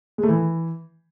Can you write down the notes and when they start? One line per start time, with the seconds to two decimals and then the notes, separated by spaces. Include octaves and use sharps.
0.18 G#3
0.23 A3
0.29 E3